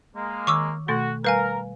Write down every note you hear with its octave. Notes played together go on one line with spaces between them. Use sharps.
G#3 A#3
D#3 C#6 D6 E6
B2 A3 F#4 A4
G3 A#4 B4 F5 G#5